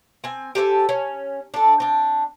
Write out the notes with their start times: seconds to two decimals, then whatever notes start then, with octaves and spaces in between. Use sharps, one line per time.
0.24 C4 G#5
0.55 G4 A4 C5 G#5
0.89 C#4
1.54 D4 A4
1.80 C4 D4